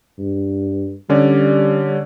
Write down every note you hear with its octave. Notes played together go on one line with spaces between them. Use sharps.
G2
D3 G3 C#4 D5